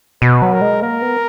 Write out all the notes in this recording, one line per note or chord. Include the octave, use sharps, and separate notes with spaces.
B2 B4
F#3
A#4
G#3
A#3 A#4
B3